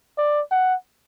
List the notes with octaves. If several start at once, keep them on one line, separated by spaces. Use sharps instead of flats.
D5
F#5